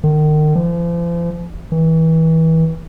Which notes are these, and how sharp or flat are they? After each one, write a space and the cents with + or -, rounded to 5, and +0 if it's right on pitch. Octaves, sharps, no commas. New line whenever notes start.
D#3 -35
F3 -40
E3 -30